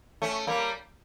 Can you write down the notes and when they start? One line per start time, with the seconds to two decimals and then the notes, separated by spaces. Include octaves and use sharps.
0.22 A3 C#4
0.47 G3 A#3